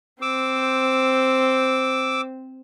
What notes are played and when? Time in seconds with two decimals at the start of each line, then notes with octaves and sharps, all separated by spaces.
0.22 C4 C5 D6 E6